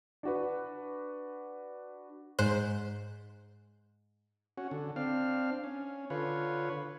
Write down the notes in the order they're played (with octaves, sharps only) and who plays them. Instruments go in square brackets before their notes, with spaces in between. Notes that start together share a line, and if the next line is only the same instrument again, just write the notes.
[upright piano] D4 F#4 B4
[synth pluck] G#2 C5 F#6 G6
[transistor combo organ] C#4 F#4
D3
C4 D4 F5
C#4
D3 F4 B4 C#5